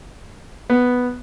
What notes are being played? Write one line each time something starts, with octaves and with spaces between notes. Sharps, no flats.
B3